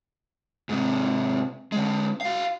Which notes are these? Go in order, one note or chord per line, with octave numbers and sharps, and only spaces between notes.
G#2 C3
D3 G#3
F#4 F5